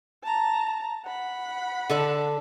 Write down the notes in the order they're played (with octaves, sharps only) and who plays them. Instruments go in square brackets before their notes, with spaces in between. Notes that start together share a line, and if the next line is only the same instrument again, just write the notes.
[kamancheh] A5 A#5
F#5 B5
[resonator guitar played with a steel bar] D3 A4 D5